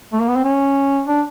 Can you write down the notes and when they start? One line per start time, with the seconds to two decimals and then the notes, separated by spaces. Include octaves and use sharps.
0.13 A3
0.21 A#3
0.28 B3
0.36 C4
0.44 C#4
1.07 D4